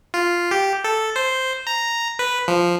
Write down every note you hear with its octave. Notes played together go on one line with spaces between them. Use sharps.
F4
G4
A4
C5
A#5
B4
F3